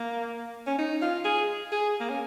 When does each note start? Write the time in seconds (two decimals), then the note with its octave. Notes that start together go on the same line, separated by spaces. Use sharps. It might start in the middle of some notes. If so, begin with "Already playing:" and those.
Already playing: A#3
0.67 C#4
0.79 D#4
1.02 F4
1.25 G#4
1.72 G#4
2.00 A#3
2.10 C#4